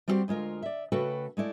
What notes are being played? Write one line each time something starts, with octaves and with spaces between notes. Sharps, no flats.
G3 C4 E4 F#4 G4 C5
D2 G#3 F4 A#4
D5 E5
C#3 A3 F#4 A4 B4 G5
G#3 A3 E4 D5